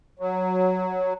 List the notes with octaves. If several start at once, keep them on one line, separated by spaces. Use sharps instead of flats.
F#3